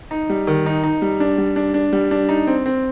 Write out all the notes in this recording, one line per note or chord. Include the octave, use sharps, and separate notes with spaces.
D#4
G3
D#3
D#4
D#4
G3
D4
G3
D4
D4
G3
D4
D#4
C4
C4